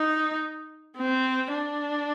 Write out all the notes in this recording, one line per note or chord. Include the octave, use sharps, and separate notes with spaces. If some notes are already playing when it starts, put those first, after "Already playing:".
Already playing: D#4
C4
D4